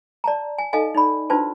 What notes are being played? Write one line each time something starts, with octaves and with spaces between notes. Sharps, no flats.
D5 A5 A#5
G#5
D#4 A4 D#5 F5 G#5
D#4 D5 B5
D4 F4 F#4 B4 C5 A5